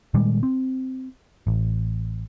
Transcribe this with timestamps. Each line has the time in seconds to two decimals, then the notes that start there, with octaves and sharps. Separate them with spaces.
0.14 A#2 D#3 G3 G#3
0.43 C4
1.47 A1